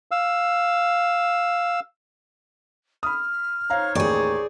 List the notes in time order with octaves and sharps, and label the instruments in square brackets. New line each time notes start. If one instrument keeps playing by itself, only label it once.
[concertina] F5 E6
[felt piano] B5 D#6 [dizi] F6
[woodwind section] D#4 C5 C#5 [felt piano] F5 A#5
[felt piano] A1 D#2 [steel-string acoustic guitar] G#4 D5 [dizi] C#6